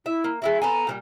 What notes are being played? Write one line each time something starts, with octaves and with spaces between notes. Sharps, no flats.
E4 E5
A#3
G#3 E4 F#4 E5
B3 A4 G#5 A#5
A#2 E3 G3